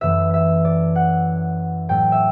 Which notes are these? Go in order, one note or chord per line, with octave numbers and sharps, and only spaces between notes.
F#2 E3 A3 E5
E5
D5
F#5
A2 F#3 A3 G5
E5